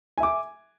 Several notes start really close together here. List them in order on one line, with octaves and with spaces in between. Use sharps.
G#5 E5 D6